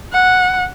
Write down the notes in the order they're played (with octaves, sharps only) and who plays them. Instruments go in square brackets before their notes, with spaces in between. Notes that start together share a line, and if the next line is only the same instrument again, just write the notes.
[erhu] F#5